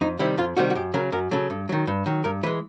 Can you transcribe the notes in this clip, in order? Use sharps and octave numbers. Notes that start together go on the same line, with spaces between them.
F2 D#4
C3 D#3 G3 E4
F2 F4
C3 D#3 G3 F#4
F#4
F#2 G4
C#3 F#3 A#4
F#2 A#4
C#3 F#3 A4
G2
D#3 F#3
G2
D#3 F#3
G2 A#4
E3 G#3 B4